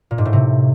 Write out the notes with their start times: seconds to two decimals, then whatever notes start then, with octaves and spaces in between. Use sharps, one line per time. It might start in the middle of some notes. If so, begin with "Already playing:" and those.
0.11 A#2
0.18 G#2
0.25 A2
0.33 C3